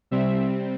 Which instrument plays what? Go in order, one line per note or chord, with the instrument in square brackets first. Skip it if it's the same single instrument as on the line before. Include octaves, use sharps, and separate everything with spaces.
[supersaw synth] C3 G3 C4 E5